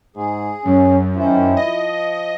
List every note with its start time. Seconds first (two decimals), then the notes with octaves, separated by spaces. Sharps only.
0.16 G#2 G#4
0.65 F#2 C#4
1.17 D#3 C#4 E4 C5
1.57 F3 D#5